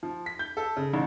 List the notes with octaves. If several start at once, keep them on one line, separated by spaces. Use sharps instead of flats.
F3
B6
G6
A4
C#3
A1